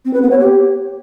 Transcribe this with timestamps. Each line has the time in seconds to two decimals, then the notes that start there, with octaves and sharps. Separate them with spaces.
0.05 C4
0.14 B4
0.22 B3
0.31 C#5
0.39 G4